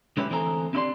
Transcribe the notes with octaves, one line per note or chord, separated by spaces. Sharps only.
D3 G#3 C#4 E4 G4 B4
D2 E3 C4 G#4 A4 A#5
C4 D4 E4 G4 D5 C6